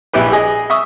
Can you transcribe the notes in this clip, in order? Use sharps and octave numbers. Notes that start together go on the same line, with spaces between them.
A#1 E4 G4 B4
G#4 D#5
E5 C#6 D#6